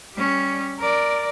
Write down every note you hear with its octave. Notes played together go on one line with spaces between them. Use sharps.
G3 C#4
A#4 D5